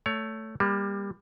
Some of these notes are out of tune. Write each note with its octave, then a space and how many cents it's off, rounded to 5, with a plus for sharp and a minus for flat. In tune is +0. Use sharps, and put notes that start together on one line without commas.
A3 +5 C#5 +25
G3 +25 A#3 +30